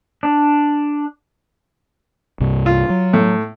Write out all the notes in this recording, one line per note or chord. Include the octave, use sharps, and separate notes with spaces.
D4
C2 G2 C3
F4
F#3
A2